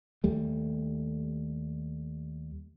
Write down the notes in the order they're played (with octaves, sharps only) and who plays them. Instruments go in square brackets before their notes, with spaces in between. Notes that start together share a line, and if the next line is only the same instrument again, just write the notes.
[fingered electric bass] D#2 G3 A3